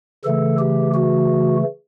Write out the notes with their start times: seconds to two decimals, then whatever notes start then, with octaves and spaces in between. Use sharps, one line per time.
0.24 C#3 E3 A3 A4
0.59 G4
0.94 F#4